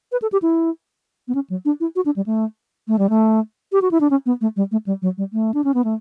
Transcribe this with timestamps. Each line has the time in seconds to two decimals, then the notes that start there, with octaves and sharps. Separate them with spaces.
0.12 B4
0.22 A4
0.32 G4
0.42 E4
1.28 B3
1.35 C#4
1.50 F#3
1.65 D4
1.80 E4
1.96 F#4
2.06 D4
2.16 G3
2.26 A3
2.88 A3
2.99 G3
3.10 A3
3.72 G4
3.82 F#4
3.91 E4
4.01 D4
4.10 C#4
4.26 B3
4.41 A3
4.56 G3
4.72 A3
4.86 G3
5.02 F#3
5.18 G3
5.33 A3
5.54 D4
5.64 C#4
5.74 B3
5.84 A3